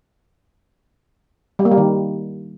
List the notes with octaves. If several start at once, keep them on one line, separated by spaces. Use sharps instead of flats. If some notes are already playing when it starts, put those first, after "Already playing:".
G3
A#3
G3
D#3